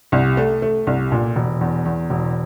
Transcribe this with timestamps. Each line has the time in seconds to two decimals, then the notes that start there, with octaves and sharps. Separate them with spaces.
0.12 C2
0.37 A3
0.62 A3
0.87 C2
1.12 A#2
1.36 E1
1.61 E2
1.85 E2
2.10 E1